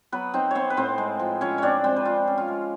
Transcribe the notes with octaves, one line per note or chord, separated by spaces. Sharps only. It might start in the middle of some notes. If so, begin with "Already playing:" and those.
F#3 B3 B4
C4 D#4 C5
B3 C4 C5 C#5
B4
A2 C4 C5
G#3
F3
F3 C#4 C#5
C4 D4 C#5 D5
G#3 C4 C5
B4
C4 F4 C5
C#4
F4 F5
G#3